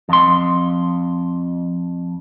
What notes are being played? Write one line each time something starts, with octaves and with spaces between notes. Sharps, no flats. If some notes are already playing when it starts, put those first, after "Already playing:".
F2 C6